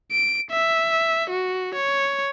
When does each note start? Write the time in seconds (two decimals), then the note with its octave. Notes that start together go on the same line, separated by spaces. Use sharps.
0.11 D7
0.51 E5
1.30 F#4
1.75 C#5